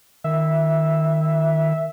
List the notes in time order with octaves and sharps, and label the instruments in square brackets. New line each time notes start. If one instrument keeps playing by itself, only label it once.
[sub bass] D#3 [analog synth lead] E5